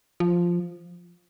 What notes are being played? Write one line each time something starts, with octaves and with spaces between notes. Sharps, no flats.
F3